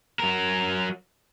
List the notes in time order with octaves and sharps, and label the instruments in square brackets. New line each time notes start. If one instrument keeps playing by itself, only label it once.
[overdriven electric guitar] F#3 A#4